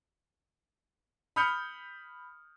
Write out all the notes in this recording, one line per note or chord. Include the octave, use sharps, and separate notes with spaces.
B5 D#6 F6 G6 C#7